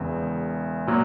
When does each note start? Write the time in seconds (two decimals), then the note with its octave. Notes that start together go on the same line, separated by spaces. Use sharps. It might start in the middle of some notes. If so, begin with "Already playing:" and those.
Already playing: E1 E2 C#3
0.87 A#2 F#3